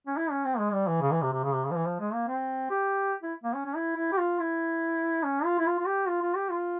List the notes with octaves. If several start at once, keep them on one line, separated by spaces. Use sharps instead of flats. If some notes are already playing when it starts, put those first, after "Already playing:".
C#4
E4
C#4
C4
G#3
G3
E3
C#3
E3
C3
C3
C#3
C3
C#3
F3
E3
F3
G#3
A#3
C4
G4
E4
A#3
C#4
C#4
E4
E4
G4
F4
E4
C#4
F4
E4
F4
F4
G4
F4
F4
G4
F4